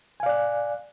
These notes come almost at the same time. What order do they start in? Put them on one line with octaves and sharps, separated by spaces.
G#5 F5 D5 F#6